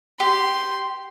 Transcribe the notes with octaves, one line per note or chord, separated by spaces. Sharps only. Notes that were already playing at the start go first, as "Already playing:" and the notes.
G4 C6